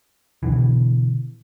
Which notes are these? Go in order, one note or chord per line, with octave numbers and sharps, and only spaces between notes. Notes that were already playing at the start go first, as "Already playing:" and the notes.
B2 D3 E3